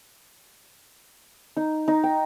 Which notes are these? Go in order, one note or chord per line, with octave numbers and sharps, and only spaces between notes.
D#4
D#4
G5